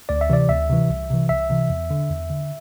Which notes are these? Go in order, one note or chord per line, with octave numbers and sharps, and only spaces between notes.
D2 D5
E5
C3 E3 D5
D2 E5
C3 E3
C2
C3 E3
C2 E5
C3 E3
E2
D3
E2
D3